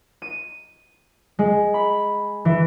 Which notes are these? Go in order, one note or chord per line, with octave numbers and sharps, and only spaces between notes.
D#7
G#3
B5
E3